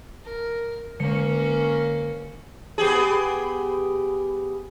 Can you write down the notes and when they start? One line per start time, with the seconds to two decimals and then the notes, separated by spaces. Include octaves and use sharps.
0.25 A#4
1.00 D3 A#3 C#4 C#7
2.78 B3 G4 G#4